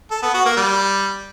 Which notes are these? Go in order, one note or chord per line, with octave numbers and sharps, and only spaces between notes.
A4
B3
F#4
A#3
G3